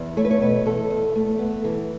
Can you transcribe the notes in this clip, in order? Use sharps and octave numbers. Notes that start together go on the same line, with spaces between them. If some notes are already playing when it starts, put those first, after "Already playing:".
Already playing: E2
A3 C#5
B4
C#5
B2 B4
E2 A4
E2
A3
B3
E3